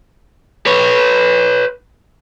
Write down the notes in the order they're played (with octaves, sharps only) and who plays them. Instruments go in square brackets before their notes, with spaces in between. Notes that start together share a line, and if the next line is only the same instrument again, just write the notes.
[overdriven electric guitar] B4 C#5